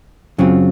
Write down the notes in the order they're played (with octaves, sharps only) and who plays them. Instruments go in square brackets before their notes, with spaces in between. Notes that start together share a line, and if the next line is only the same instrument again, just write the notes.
[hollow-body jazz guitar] F#2 C#3 F#3 C4 F4